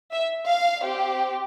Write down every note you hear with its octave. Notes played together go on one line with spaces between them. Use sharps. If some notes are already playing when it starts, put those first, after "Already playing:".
E5
F5
C4 G4